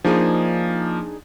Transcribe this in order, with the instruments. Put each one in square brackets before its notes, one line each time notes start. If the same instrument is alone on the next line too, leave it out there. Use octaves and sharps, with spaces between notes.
[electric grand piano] F3 A#3 [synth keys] D4 D#4 G#4